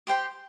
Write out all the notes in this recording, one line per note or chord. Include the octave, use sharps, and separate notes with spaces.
G4 C5 G5 C6